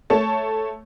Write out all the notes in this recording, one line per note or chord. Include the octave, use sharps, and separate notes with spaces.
A3 C#5 A5